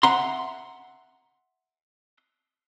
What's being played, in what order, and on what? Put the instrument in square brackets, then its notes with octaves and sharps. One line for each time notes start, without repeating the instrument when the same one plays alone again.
[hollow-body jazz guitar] E5 F#5 A#5 C6